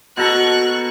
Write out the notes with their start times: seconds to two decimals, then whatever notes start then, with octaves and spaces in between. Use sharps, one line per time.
0.17 B2 F#4 A4 A#5 C#6 F#6